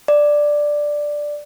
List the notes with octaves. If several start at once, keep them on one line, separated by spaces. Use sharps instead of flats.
D5